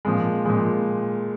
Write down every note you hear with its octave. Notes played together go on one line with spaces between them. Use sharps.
A#2 F3 G#3
A#2 F3 G#3